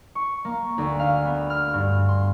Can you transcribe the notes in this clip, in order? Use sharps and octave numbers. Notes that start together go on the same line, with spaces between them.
C#6
A#3
D2
F5
B3
F6
G2
C6